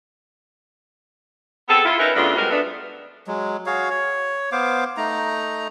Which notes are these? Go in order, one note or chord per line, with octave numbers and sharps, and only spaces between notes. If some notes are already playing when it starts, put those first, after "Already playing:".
B3 C4 G#4 A4
E4 F4
C#4 D#4 E4 A#4 B4
F#2 C#3 A3 B3 D4 F4
F3 G3 G#3 B3 F#4 A#4
A3 B3 D4
F#3 G#3
F#4 G#4 C#5 F5
C#5
B3 C5 F5 D6
A3 D#4 A#5